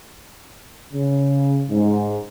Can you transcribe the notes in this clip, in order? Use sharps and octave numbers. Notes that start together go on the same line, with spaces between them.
C#3
G#2